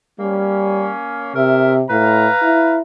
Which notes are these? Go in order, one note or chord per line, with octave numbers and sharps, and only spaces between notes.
G3 A#3 C#4
C3 A#4 E5
A2 B4 F5 A#5
E4